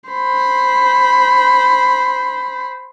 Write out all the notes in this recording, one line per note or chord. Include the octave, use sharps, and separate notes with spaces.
C5 B5